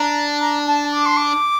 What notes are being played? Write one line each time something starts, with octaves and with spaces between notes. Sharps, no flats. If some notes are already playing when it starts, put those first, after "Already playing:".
Already playing: D4 A#5
A#5
A5
D6
C6
D6